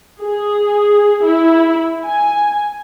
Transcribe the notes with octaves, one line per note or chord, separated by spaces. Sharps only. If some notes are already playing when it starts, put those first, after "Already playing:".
G#4
E4
G#5